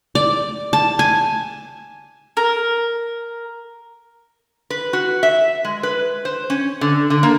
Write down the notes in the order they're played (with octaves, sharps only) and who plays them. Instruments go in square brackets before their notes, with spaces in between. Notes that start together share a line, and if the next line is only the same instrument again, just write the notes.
[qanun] D5
A5
G#5
[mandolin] A#4
[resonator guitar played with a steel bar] B4
F#4
E5
G#3
B4
C5
C#4
D3
D3
A#3